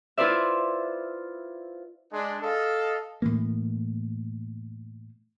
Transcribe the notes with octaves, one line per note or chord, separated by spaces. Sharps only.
E4 F4 B4 C5 D5 E5
G#3 D4
A4 D#5 F5
A2 E3 A#3